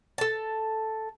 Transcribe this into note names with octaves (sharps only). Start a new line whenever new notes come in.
A4 A5